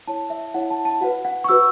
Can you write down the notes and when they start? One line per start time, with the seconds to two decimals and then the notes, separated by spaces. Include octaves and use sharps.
0.08 E4 C#5 A5
0.30 E5
0.54 E4 C#5 F#5
0.70 A5
0.85 A5
1.01 F#4 B4 F#5
1.25 F#5
1.44 C#6
1.48 F#4 B4 E6